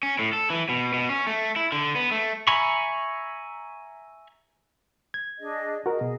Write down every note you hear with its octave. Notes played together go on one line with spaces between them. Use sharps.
C#4
A2
A4
E3
B2
B2
C#4
A3
E4
D3
B3
A3
E5 G#5 A#5 B5 C#6
G#6
D4 G#4 D#5
F#4 G#4 A#4 D#5
B2